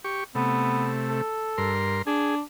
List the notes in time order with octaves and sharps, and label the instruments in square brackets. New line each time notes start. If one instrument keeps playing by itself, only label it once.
[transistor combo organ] G4 C#6
[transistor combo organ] C3 A3 [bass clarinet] B3
[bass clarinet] A4
[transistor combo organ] G2 A#4 C6
[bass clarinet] D4 [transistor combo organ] G#4